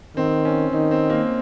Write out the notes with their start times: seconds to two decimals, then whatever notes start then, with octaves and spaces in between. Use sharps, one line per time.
0.16 D#3 C4
0.45 C#4
0.72 D#3 D#4
0.91 C4
1.10 A#3